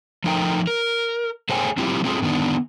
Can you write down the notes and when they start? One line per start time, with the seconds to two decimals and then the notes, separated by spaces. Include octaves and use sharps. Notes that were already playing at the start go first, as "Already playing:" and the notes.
0.24 F3 A3 D#4 A#4 F#5 G5
0.67 A#4
1.49 A3 G#4 C5 C#5 G5 G#5
1.77 F#3 C4 E4 F4 G4
2.04 A3 C4 C#4 F4 G#4
2.22 D3 D#3 B3 D4 D#4